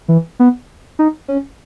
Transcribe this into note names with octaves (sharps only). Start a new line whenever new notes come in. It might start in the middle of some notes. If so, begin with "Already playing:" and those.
E3
B3
D#4
C#4